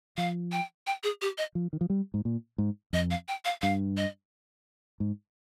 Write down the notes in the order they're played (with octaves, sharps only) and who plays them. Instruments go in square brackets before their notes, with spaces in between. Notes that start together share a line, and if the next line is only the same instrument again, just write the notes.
[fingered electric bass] F3 [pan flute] F5
[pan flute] G5
G5
G#4
G4
D#5
[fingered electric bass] F3
D#3
F3
G3
G#2
A#2
G#2
[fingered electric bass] F2 [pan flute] D#5
[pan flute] F5
G5
F5
[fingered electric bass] G2 [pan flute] F5
[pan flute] D#5
[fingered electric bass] G#2